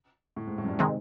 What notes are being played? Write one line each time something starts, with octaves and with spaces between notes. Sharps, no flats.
A2
G#2
A2
F#2
G2
C3 D#3 G#3 C4